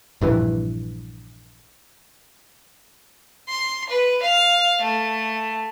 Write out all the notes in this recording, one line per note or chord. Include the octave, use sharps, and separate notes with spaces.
A#1 G2 E3
C6
B4
F5
A3